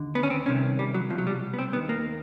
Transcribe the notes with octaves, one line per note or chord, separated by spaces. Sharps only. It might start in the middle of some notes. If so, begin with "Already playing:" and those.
Already playing: D#2 D3
B3
C#4
C4
C2 C3 D#3 C#4
G3
F#3
C2 B2 F3
F#3
G3
B3
C4
D#2 D#3 B3
A#3